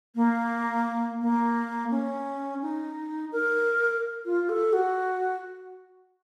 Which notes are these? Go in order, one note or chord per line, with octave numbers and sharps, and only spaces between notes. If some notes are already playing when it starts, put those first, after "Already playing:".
A#3
A#3
C#4
D#4
A#4
F4
A4
F#4